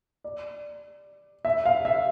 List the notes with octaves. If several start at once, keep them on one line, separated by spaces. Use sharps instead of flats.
D5
E5
F5
E5